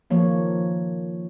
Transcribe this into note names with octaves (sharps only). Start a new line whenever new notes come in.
D#3 F3 A#3 C#5